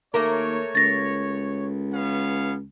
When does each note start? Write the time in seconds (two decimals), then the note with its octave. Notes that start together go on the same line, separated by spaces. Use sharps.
0.14 D#2 A3 A#3 A#4 C#5
0.75 C#2 A6 A#6
1.92 B3 C#4 F5